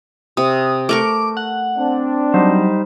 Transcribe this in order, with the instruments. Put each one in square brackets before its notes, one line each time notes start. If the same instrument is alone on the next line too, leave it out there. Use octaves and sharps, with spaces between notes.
[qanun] C3 [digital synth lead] D#6
[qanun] A3 A#4 C#6 [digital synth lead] D6
[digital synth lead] F#5
[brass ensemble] C4 D4
[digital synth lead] F#3 [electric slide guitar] G3 D#4 C5